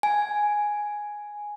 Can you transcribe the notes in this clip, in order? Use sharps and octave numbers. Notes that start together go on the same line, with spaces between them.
G#5